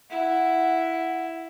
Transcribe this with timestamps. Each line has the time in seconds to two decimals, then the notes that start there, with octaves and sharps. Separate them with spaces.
0.11 E4 F#5